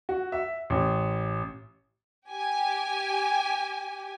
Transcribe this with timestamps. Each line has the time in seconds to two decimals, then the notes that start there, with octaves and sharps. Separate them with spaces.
0.09 F#4
0.32 E5
0.70 A1
2.30 G4 G#5